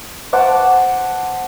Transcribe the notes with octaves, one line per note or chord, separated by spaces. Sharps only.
C5 F#5 A5 D6